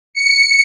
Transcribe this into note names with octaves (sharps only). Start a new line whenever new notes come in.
C#7